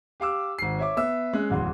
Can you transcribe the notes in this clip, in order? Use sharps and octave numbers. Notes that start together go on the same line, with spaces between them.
G4 F5 D6 E6
G#1 C7
C#5 E5 D6
B3 E5 E6
G#3 C#4 F#6
D1 E2 C6